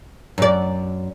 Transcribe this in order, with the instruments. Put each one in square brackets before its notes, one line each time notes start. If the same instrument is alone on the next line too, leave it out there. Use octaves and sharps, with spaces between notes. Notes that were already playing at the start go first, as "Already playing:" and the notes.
[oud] F#2 D5